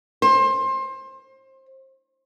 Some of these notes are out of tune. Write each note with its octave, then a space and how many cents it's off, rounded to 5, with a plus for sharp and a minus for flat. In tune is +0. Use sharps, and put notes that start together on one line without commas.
C5 +25